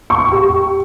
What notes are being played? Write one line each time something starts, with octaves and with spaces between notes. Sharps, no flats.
C#6
G4